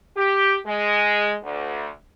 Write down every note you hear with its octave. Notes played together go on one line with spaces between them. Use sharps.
G4
G#3
D2